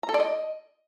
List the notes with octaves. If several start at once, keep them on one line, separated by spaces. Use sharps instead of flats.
A#5
A4
D5
D#5